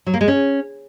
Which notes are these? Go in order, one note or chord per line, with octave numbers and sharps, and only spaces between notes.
F#3
A#3
G#3
C#4